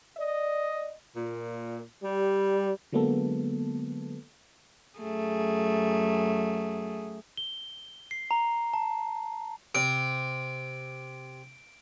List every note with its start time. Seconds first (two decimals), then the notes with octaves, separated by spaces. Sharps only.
0.17 D5 D#5
1.16 A#2
2.03 G3
2.92 D3 F#3 G#3 A#3 B3 A4
4.99 F#2 A3 G#4
7.37 G7
8.11 C7
8.31 A#5
8.73 A5
9.75 C3 D7